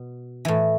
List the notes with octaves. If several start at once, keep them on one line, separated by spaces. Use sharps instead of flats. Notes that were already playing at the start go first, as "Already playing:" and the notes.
Already playing: B2
A2 E3